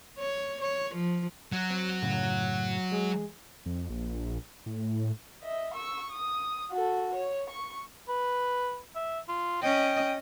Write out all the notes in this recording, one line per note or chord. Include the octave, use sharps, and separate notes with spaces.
C#5
C#5
F3
F#3
C4
F#2 A2 C#3
G#3 G#4
F2
A#1
A2
D#5 E5
C#6 E6
D#6
F#4 A4
C#5
C#6
B4
E5
F4
C#4 D#5 G5